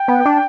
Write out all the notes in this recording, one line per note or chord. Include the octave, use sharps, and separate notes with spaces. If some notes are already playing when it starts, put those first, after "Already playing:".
Already playing: G5
B3
D4